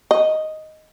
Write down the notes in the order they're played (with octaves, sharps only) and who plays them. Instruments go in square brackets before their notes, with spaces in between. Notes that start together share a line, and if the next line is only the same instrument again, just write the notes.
[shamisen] D#5